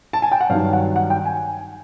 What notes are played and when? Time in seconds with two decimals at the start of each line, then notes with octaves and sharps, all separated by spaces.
0.13 A5
0.22 G#5
0.32 G5
0.41 F#5
0.49 G2 D#3 F#3 F5
0.73 F#5
0.96 F#5
1.10 G5
1.25 G#5